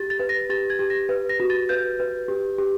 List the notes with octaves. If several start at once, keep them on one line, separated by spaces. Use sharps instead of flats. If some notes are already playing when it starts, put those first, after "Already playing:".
Already playing: G4 A6
A6
B4
A#6
G4 A6
G#6
G4
A#6
B4
A#6
F#4
A6
B4 G6
B4
G4
G4